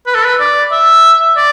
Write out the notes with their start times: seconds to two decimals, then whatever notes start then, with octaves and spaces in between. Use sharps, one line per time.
0.07 B4
0.15 A4
0.24 B4
0.39 D5
0.72 E5
1.37 D5